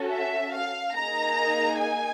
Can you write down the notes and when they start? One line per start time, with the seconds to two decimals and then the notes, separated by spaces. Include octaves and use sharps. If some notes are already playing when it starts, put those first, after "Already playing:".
Already playing: C#4 F#4 A4
0.12 E5
0.53 F5
0.95 A#3 D#4 G#4 A#5
1.79 G#5